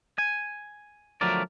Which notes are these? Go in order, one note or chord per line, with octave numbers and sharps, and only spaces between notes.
G#5
D3 F3 F#3 A3 A#4 D5